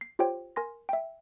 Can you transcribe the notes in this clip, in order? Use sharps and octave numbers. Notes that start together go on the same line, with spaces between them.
C7
F4 G4 C5 C#5 G5
A#4 G#5 C6 A#6
E5 G5